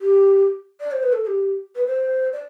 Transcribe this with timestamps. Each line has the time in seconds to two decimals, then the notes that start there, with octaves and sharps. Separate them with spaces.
0.01 G4
0.80 D5
0.92 C5
1.03 B4
1.13 A4
1.24 A4
1.27 G4
1.76 B4
1.87 C5
2.33 D5